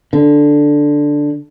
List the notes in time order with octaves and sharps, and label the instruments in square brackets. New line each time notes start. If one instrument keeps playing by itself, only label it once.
[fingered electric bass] D3